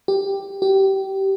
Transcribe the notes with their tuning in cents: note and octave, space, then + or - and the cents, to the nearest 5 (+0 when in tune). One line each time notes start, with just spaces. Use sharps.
G4 +5
G4 -20